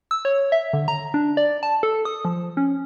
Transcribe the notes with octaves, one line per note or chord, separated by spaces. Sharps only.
E6
C#5
E5
D3
A#5
D4
D5
A5
A4
D#6
F3
C#4